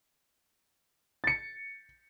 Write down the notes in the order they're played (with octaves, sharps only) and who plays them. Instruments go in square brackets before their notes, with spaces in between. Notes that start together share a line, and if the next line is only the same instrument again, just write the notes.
[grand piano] A6 C#7